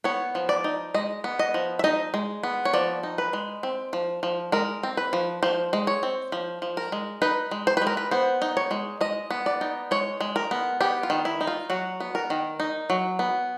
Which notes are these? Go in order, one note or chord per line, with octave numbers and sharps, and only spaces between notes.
B3 C#5
F3
D5
D#4
G#3 D#5
B3
D#5
F3
E5
D#4 D#5
G#3
B3
C#5
F3 D5
D#4
B4
G#3
C4
F3
F3
G#3 A#4
C4
B4
F3
F3 C5
G#3
C#5
C4
F3
F3
A#4
G#3
D#4 B4
G#3
C5
B4
G#3
A#4
B4
B3 C5
D#4
C#5
G#3
G#3 D#5
B3
D5
D#4
G#3 C#5
G#3
A#4
B3
B3 G4
F4
D#3
E4
D#4
F4
F#3 F#4
B3
A#4
D#3
D#4
F#3
B3